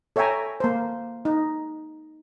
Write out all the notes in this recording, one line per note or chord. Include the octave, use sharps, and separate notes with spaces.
A4 C#5 E5 G5 G#5 A#5
A#3 C5
D#4